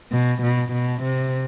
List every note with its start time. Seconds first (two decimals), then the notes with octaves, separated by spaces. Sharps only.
0.12 B2
0.43 B2
0.73 B2
1.03 C3